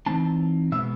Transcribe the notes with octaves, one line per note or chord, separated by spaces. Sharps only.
E3 G#3 C4 D#4 A5
B2 G#3 B3 E5